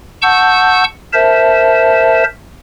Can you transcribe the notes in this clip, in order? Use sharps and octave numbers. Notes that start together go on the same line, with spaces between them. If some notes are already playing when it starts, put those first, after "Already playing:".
F#5 A5 C#6 E6 G6
A#4 C5 E5 A5